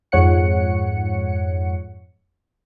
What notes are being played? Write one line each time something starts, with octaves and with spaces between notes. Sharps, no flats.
F2 G#2 C#5 F#5 C#7